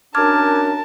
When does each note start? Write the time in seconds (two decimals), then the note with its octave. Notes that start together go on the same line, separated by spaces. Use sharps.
0.15 F#2 C#4 D4 A#4 A5 D6 F6 G#6